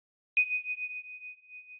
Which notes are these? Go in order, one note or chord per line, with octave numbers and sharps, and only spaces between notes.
D#7